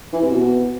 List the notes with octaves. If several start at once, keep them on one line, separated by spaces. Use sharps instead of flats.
E3
C3
B2